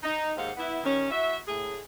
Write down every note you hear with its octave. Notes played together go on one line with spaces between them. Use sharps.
D#4
D#2 G#2 C5 F5 F#5
B3 E4
D#3 G3 C#4
E4 F#4 E5
A2 G#4